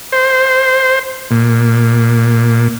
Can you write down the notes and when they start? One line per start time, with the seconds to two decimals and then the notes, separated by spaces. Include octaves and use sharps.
0.12 C5
1.31 A#2